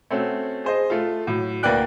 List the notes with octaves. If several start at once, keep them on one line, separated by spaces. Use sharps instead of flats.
A3 C4 C#4 F#4
G#4 C5 D#5
A3 F4
A2 F#3
D2 A#3 B4 D5 G5 F#6